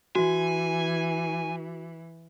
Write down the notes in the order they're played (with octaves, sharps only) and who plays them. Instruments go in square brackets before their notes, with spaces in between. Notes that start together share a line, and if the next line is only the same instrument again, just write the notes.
[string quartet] E3 [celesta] F#4 [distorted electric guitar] G#5